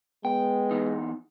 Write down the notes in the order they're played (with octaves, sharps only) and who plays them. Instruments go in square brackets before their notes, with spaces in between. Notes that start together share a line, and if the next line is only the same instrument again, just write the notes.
[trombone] G#3 [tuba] B3 [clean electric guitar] G5
[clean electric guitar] E2 D#4